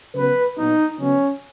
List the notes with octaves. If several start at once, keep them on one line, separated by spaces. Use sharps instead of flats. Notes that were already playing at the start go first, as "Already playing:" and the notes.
C#3 F#3 B3 B4
A#2 F#3 B3 D#4
C#3 F#3 B3 C#4